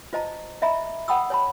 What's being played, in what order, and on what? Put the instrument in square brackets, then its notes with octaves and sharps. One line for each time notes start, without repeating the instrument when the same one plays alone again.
[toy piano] F4 C5 D#5 A5 A#5
D#5 E5 A#5 B5
F#5 G5 B5 D#6 E6
C#5 A5 B5